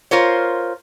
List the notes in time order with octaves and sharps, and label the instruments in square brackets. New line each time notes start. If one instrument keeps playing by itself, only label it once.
[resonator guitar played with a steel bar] F4 A#4 C5 C#5